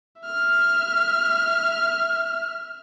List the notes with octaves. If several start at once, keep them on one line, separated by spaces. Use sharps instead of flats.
E5 F6